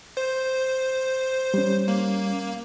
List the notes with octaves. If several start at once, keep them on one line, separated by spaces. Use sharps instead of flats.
C5
G3 C#4
A#3